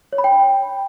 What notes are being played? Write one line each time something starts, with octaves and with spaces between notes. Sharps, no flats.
C#5
B5
G5